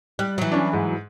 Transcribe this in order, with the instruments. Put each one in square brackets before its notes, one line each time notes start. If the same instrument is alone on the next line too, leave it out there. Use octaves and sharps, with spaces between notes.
[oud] G3 [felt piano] F#6
[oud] E3 F#3
[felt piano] C#4 D4
G#2